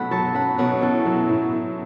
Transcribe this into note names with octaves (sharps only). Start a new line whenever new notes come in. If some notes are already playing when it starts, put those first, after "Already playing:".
Already playing: B2 F#3 A3 C#4 F#5 B5
F#3 A5 C#6
C#4 F#5 B5
B2 C#5 F#5
C#4 E4 A4
F#3
A2
A2